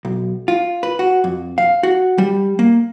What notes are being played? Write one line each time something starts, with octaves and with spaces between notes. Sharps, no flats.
B1
F4
B4
F#4
F2
F5
F#4
G3
A#3